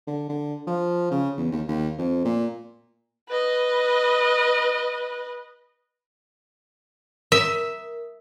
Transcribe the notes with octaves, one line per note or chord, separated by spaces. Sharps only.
D3
D3
F3
C#3
E2
D#2
D#2
F2
A#2
B4 D#5
A#4 E5